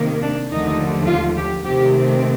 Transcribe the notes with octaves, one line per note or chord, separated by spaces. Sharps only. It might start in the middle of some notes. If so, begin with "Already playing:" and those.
Already playing: C3 D#3 A#3
D4
D#2 D3 F3 A3 D#4
F4
G4
C3 D#3 A3 C4 G4